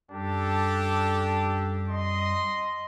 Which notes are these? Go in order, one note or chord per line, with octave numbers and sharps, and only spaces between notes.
F#2 G3 D4 G4 A4
D#5 C6